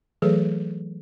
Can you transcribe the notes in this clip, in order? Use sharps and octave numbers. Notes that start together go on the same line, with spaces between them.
E3 F#3 A3 G#4 A4 B4